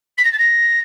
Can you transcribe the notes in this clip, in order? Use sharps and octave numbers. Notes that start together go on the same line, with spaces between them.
B6
A#6
A6
A#6